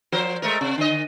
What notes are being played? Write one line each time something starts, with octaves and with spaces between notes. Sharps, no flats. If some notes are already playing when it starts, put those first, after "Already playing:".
F3 A#4 C5
G#3 A3 A#4
C3
D3 D#5